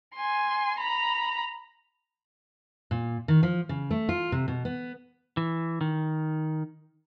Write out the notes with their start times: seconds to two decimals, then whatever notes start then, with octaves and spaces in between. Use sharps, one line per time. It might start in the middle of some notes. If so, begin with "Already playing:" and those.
0.15 G#5 C6
0.79 A#5 B5
2.91 A#2
3.28 D#3
3.43 F3
3.69 C#3
3.91 A3
4.09 F4
4.32 C3
4.48 B2
4.65 B3
5.37 E3
5.81 D#3